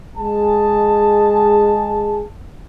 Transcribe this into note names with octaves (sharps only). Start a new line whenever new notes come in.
G#3 G#4 A5